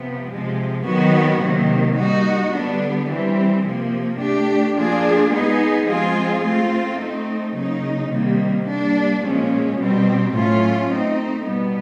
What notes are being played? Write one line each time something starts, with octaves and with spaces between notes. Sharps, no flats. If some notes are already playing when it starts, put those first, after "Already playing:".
Already playing: C3 F3 B3
C3 F3 G#3
D#3 F#3 B3 D#4 F#4
C3 D#3 F#3 A#3
G3 A#3 D#4 F#4
D3 G3 B3 D4
E3 G3 C4
C3 F3 A#3
A3 D4 G4
F3 A#3 D4 F4 G#4
G#3 B3 D#4 G#4
F3 G#3 C4 F4 G#4
A3 C4 F4
A3 C4 D#4
C#3 F#3 A#3 D#4
C3 D#3 G3 A#3
G3 A#3 D4
A#2 F3 G#3 C#4
B2 G3 C4
A2 F#3 A3 C#4 F4
A3 C4 D#4
B2 G3 B3